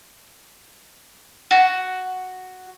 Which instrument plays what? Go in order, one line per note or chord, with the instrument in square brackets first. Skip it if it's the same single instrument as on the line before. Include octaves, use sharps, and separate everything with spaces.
[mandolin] F#4